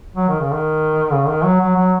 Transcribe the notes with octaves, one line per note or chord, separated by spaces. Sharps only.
F#3
D#3
C#3
D#3
C#3
D#3
F#3
F#3
F#3